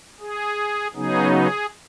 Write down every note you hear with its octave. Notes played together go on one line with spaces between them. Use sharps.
G#4
C#3 F#3 B3 D#4 G#4
G#4